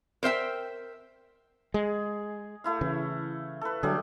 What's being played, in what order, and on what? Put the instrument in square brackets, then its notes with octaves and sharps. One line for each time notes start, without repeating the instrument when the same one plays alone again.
[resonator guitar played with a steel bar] A#4 C5 E5 G5
[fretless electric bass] G#3 [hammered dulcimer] G#4
[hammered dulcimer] A3 E4 F5
[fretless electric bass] C#3 E3
[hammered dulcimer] A4 B4
[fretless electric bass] D3 F#3 [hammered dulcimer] G3 A3 G#4